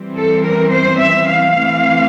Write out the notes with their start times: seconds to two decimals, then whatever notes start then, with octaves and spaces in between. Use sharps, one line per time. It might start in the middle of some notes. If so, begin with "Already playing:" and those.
Already playing: E3 G3 C4
0.17 A4
0.45 A#4
0.73 C5
1.01 E5
1.29 F5
1.57 E3 A3 C4